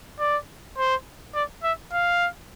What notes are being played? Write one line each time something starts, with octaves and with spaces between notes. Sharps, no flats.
D5
C5
D5
E5
F5